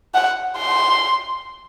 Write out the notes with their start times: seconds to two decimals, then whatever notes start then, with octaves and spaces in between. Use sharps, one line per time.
0.14 F#5
0.58 C6